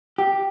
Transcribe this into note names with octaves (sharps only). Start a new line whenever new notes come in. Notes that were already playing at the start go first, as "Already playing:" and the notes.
G4